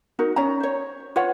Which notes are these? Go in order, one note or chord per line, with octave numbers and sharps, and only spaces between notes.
D#4 F#4 A#4
C#4 C#5 A#5
C5 C#5
F4 B4 C#5 F#5